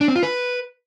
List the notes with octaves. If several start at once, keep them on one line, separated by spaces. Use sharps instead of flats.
D4
C4
F4
B4